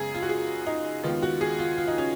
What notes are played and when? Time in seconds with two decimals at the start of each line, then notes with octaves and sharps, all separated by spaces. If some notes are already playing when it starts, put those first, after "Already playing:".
Already playing: F#2 C#3 G#3 B3 G#4
0.14 F4
0.23 F#4
0.29 G#4
0.67 D#4
1.03 D#2 D#3 G#3 B3 F4
1.22 F#4
1.41 G#4
1.59 F4
1.77 F4
1.88 D#4
1.98 C#4